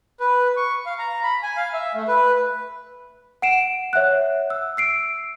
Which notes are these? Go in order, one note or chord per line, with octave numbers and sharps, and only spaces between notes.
B4
C#6
F5
A#5
B5
G#5
F5
E5
A3
B4
F#5 C7 D7 E7
C#5 E5 F#5 F#6
E6
E6 C7 D7